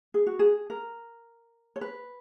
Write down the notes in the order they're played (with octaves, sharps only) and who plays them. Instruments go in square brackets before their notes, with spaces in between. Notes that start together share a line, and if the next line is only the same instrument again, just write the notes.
[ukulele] G#4
F#4
G#4
A#4
C#5
B4